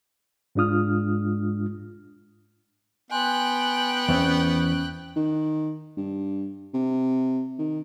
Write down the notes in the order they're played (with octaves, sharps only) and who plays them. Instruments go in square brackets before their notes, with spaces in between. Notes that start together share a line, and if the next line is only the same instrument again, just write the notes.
[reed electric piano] G#2 G#3 D4 F4 D#6 F6
[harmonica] B3 [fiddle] G5 F#6 [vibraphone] G#5 C6
[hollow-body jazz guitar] E2 C4 [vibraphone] C#4
[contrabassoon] D#3
G2
C3
D#3